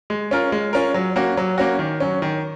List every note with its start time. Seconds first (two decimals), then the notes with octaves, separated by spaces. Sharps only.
0.10 G#3
0.31 C#4 F4 A#4
0.52 G#3
0.73 C#4 F4 A#4
0.94 F#3
1.16 A#3 C#4 F#4
1.37 F#3
1.58 A#3 C#4 F#4
1.79 D#3
2.00 F#3 C#4
2.22 D#3